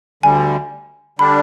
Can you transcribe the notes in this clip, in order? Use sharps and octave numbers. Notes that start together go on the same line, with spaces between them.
D2 D3 G3 G#5
D3 G3 D4 B5